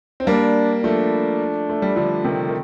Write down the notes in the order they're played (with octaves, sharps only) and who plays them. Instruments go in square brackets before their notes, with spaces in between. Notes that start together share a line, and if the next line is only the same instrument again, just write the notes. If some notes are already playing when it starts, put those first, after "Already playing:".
[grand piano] C4
[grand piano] G3 A#3 [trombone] D4
[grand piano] F3 A3 [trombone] D4
[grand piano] A3
G3
D3 F3
C3 D#3
D#3